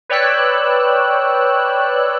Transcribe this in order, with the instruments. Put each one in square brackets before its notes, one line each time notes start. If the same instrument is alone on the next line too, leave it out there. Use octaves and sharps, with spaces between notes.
[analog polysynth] B4 C#5 D5 G5 E6 F#6